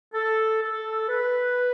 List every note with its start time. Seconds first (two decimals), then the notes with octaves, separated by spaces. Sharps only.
0.14 A4
0.62 A4
1.09 B4